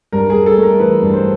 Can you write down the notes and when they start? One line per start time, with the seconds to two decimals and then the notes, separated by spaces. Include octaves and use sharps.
0.12 G2 A#4
0.30 G2 G#4
0.46 A4
0.58 A3
0.63 A#4
0.80 E3 B4
1.02 G2
1.14 C5